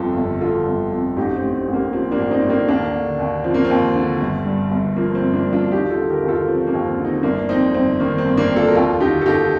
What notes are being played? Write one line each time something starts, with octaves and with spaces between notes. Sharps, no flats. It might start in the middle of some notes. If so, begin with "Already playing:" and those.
Already playing: G1 F2 F4 A4
G1
D3 F4 A4
G1
F2
A1 D#4 G4
C4
A2
C4
A1
A#3
F3 C4
A#3 D4
A1
C4 D#4
A2
A#3 D4
D#2 A#3 D4
D3
D#2
F3 C4
A#3
C4
D#2
D3
G1
G2
G1
F3 A#3
C4
G1
A#3 D4
G2
D4 F4
D#2 D#4 G4
F4 A4
D3
G4 A#4
D#2
F4 A4
F3 C4
A#3
D#2
C4
D3
C4 D#4
G1 A#3 D4
F2 C4 D#4
G1 C4
D#3 A#3
C4
G1
A#3 D4
F2
F4 A4
A#4
D#2 F4 A4
D3 D#4 G4
A4
D#2 D#4 G4